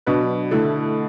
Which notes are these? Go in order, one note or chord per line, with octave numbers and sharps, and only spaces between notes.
B2 F#3 D4 F#4 B4
D3 A3 E4 A4